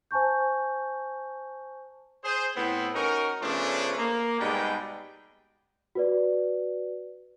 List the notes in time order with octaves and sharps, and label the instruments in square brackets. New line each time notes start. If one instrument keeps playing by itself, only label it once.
[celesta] C5 G#5 A5 C#6 G6
[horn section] G#4 C5
A2 B3 C4
C#4 D#4 F#4 A#4
C#3 F3 A3 B3 C#4 D4
A#3
G#2 B2 G3 G#3 B4 G5
[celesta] F#4 B4 D5